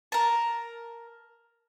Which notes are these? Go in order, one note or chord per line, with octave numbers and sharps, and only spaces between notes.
A#4 A5